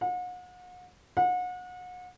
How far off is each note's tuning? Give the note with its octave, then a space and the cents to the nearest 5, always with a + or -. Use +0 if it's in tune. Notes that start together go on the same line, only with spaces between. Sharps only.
F#5 -40
F#5 -35